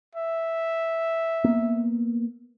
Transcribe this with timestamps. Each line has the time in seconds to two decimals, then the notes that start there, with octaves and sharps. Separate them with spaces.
0.15 E5
1.44 A#3 B3